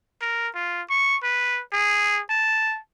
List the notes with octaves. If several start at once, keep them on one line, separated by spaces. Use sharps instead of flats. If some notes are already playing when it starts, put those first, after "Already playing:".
A#4
F4
C#6
B4
G#4
A5